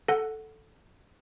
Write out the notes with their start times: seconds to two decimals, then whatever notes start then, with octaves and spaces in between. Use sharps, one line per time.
0.08 A4 F#5